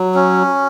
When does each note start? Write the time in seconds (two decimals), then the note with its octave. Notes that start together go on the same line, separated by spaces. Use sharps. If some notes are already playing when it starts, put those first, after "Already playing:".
Already playing: F#3
0.15 C#4